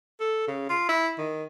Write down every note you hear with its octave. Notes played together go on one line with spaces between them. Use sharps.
A4
C#3
F4
E4
D#3